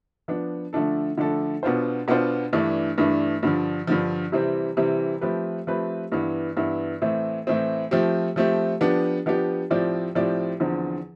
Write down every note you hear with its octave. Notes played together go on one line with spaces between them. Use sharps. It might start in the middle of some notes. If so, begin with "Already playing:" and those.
F3 B3 D4
D3 F3 A3 D4 A4
D3 F3 A3 D4 A4
B2 B3 D4 F4 C5
B2 B3 D4 F4 C5
G2 E3 A3 D4
G2 E3 A3 D4
G2 D3 F3
G2 D3 F3
C3 E3 G3 C4 G4
C3 E3 G3 C4 G4
F3 A3 C4 G4 B4
F3 A3 C4 G4 B4
G2 E3 B3 E4
G2 E3 B3 E4
A2 E3 A3 C4
A2 E3 A3 C4
F3 A3 C4 G4
F3 A3 C4 G4
F3 B3 D4 G4
F3 B3 D4 G4
A2 F3 C4 G4 D5
A2 F3 C4 G4 D5
E2 D3 F3 C4